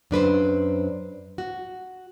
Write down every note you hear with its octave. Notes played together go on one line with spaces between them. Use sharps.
F#2 D4 B4 C5
F#4